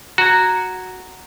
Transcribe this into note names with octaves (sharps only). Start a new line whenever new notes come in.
F#4 A#5 G#6